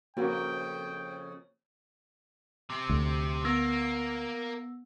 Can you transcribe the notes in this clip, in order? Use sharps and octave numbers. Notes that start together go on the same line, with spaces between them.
F2 C#3 A#3 F#4 G5
C3 C4
D2
A#3 B3 E6 A#6